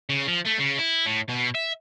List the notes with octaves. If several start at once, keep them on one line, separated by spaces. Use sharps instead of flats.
C#3
F3
A3
C#3
E4
A2
B2
E5